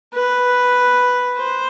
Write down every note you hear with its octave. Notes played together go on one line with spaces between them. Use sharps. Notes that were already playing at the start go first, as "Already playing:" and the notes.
B4
C5